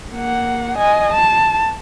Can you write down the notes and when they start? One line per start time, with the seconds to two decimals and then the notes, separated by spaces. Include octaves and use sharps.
0.12 A#3 F#5
0.78 D#5 G#5
1.11 A5